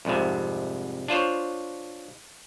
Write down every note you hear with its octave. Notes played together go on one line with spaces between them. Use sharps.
C2 F2 G#2 C3
D4 F4 C5 C#5